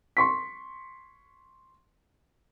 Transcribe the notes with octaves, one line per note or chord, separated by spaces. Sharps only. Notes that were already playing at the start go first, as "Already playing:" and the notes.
C6 C#6 B6